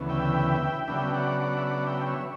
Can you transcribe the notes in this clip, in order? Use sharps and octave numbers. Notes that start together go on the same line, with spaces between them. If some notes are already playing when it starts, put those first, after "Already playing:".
Already playing: D2 C#3 E3 B3
E5 G5
C#3 F#3 B3 D4 E5 G5
D5 F#5
D5 F#5
E5
D5 F#5
E5 G5
C#5 E5